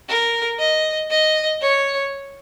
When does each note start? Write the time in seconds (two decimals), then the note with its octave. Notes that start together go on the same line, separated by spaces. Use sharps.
0.08 A#4
0.59 D#5
1.10 D#5
1.61 C#5